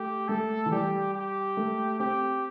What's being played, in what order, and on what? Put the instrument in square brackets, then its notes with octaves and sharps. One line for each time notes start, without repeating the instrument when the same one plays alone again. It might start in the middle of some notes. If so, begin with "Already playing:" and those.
Already playing: [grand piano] A3 [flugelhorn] G4
[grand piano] A3 [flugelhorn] A4
[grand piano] E3
[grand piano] G3 [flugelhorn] G4
[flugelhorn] G4
[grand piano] A3
[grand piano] C4 [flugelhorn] G4